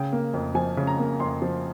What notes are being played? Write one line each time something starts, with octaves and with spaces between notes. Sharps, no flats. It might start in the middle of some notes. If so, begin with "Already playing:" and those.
Already playing: C#3 G5
A#3
F2
F3 G#5
C#3
A#5
A#3
F2 C6
F3